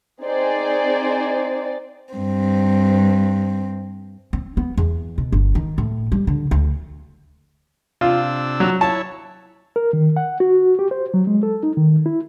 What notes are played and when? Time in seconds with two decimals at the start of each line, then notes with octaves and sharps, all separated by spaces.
0.22 C4 D#4 G#4 C5 D5
2.14 G2 C4
4.33 C4
4.57 B3
4.77 E2
5.18 B2
5.32 G1
5.55 D#3
5.78 A2
6.12 G3
6.27 D3
6.51 D2
8.01 C3 D4 F4 E6
8.60 F#3
8.81 E4 C#5 A5
9.76 A#4
9.93 D#3
10.17 F#5
10.40 F#4
10.79 G4
10.91 C5
11.14 F#3
11.27 G#3
11.43 A4
11.63 D#4
11.77 D#3
12.06 E4